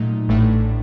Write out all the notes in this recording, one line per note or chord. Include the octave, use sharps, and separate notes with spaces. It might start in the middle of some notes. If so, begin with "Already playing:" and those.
Already playing: A#2 F#3 A3 D#4
A1 A2 A3 D4